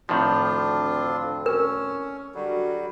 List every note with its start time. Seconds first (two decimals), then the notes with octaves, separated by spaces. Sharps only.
0.09 D2 A2 D3 D#3 F3 C4 D4 F4
1.46 C#4 A#4
2.35 D3 F#3 G3 F#4